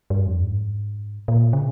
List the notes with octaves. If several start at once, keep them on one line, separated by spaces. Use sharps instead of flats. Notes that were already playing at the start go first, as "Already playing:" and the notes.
G2
F2
G#2
A#2
C#3